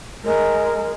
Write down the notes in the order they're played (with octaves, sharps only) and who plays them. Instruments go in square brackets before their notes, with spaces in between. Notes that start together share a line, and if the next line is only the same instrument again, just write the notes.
[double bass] G#3 [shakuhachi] A#4